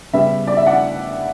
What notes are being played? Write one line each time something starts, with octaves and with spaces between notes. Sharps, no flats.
C#3 G3 B3 E5
D5
E5
D5 F#5